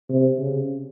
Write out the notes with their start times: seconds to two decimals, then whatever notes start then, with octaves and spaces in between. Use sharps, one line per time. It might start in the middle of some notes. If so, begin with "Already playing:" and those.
0.09 C3
0.38 C#3